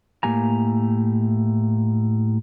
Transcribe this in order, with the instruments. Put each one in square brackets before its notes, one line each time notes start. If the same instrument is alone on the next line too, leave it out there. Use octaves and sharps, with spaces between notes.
[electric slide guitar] A2 A#3 G4 G#5 A#5